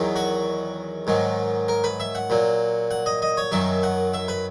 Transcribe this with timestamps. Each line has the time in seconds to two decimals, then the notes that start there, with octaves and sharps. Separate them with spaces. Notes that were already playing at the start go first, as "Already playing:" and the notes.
Already playing: E2 D#3 F#3
0.16 F#4
1.07 G#2 D#3 F#3
1.68 A#4
1.84 B4
2.00 E5
2.15 F#5
2.30 A#2 F#3
2.91 F#5
3.06 D#5
3.22 D#5
3.37 C#5
3.52 F#2 D#3 F#3 E5
3.83 F#5
4.14 E5
4.28 B4